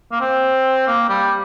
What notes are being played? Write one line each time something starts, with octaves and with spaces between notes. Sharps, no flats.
A#3
C4
A#3
G3